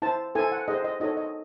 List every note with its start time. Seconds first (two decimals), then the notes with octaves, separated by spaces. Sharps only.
0.02 E4 C5 A5
0.35 E4 A4 C5 G#5
0.52 F#5
0.68 E4 G#4 C5 D#5
0.84 D#5
1.00 D#4 F#4 A4 C#5 D#5
1.17 D#5